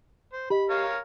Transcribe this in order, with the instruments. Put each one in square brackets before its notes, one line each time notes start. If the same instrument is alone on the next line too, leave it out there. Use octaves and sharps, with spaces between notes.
[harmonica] C5
[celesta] G4 D#5 [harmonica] B5
[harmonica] A#4 C#5 F5